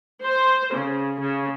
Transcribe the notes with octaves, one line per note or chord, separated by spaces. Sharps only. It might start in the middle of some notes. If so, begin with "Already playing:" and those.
C5
C#3
C#3